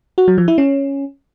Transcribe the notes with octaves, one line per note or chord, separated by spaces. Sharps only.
F#4
F#3
F3
E4
C#4